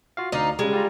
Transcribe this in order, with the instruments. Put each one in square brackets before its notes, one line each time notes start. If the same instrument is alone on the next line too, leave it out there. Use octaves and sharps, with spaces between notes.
[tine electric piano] F4 F#4 F5
[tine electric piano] D2 D5 F5 [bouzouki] D#4
[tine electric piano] C#3 G3 [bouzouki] G#3
[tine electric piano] G3 F4 A#5